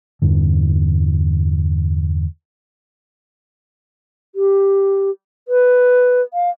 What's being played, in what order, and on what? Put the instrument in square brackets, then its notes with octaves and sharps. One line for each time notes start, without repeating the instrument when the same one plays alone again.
[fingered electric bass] E2 G2 D3
[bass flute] G4
B4
F5